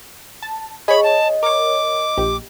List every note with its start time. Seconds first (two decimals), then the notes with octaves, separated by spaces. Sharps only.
0.42 A5
0.88 G#4 C#5 D#5 B5
1.04 A5
1.43 A#4 C#5 D6
2.17 A#1 G4